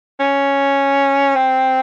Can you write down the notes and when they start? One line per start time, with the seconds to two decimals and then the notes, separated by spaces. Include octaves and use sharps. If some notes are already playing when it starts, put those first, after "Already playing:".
0.20 C#4
1.36 C4